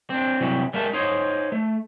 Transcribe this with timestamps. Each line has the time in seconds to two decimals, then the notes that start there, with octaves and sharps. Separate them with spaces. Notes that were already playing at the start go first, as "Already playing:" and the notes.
0.10 C4 D4
0.41 C3 E3 F#3 G3
0.73 G3 G#3 A#4 E5 A5
0.93 D#4 C5 C#5
1.52 A3